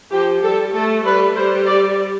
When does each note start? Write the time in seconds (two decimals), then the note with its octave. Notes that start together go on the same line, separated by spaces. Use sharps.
0.11 F3 G4
0.43 G3 A4
0.74 A3 A4
1.05 G3 B4
1.36 G3 C5
1.67 D5